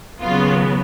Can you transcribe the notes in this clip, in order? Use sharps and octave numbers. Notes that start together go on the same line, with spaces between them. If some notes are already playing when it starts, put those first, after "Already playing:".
D#2 C#3 F#3 B3 F4